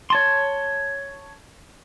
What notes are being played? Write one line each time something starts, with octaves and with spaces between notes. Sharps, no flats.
C#5 A5 C6